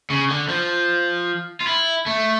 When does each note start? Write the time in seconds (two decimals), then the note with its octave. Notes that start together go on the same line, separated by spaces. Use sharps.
0.10 C#3
0.30 D3
0.49 F3
1.61 F4
1.67 E4
2.06 A3